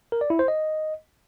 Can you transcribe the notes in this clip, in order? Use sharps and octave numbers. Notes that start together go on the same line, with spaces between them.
A#4
D5
E4
C5
D#5